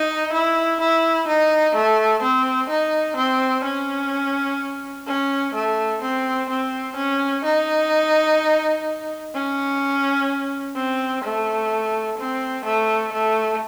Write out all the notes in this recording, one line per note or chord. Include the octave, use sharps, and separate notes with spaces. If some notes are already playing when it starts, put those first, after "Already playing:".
Already playing: D#4
E4
E4
D#4
A3
C4
D#4
C4
C#4
C#4
A3
C4
C4
C#4
D#4
C#4
C4
A3
C4
A3
A3